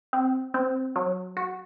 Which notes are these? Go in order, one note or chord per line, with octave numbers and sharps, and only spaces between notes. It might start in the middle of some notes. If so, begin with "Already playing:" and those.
C4
C4
F#3
F#4